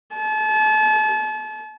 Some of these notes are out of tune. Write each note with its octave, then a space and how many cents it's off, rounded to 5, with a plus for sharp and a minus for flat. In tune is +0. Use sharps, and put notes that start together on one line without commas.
A5 -35